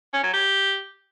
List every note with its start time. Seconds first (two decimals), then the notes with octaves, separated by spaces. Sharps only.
0.13 C#4
0.23 F#3
0.33 G4